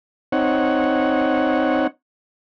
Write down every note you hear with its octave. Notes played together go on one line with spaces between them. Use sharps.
C4 D#4 C#5 F#5